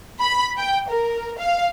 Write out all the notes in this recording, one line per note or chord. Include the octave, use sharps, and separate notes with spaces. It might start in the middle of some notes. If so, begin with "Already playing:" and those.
B5
G5
A#4
F5